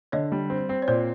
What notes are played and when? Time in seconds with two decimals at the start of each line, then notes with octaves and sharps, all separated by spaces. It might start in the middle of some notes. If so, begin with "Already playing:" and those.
0.12 D3 C#5 D#5
0.32 G3
0.50 C4
0.69 C4
0.82 C#5
0.88 A#2 C5 D5